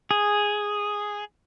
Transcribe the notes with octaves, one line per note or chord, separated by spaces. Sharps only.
G#4